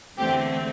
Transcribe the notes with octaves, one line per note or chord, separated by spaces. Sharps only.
E2 D3 A3 C4 G4